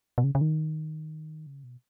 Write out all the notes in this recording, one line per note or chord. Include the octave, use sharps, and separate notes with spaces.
B2
C#3
C#3
D#3
C#3
B2